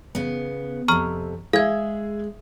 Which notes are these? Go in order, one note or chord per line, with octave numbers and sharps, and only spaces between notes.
C#3 B3
F2 C3 A#5 C#6 F6
G#3 G#4 E5 F5 G#6